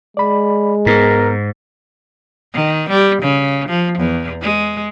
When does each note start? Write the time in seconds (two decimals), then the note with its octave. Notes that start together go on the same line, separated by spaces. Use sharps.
0.17 G#3 D5 B5
0.86 G#2 B3 A#4
2.54 D#3
2.90 G3
3.22 C#3
3.69 F3
3.99 E2
4.42 G#3